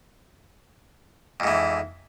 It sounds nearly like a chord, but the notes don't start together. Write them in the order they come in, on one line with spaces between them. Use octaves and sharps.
F2 G#2 E3